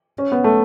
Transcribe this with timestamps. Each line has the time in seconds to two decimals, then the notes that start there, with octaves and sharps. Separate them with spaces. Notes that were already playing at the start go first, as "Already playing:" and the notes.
0.18 C#4
0.32 B3
0.44 A3